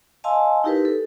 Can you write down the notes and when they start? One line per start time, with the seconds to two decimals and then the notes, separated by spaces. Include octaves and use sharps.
0.24 D#5 F5 G#5 A5 C6 E6
0.64 D#4 E4 G4 A#4 B4
0.85 A4